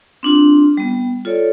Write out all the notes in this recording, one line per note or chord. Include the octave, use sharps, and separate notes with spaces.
C4 D4 F4
G3 B3
F4 A4 C#5 D5